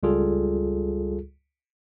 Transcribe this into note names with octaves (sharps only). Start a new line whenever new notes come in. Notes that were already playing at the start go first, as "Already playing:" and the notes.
C#2 G3 F4 G#4 A4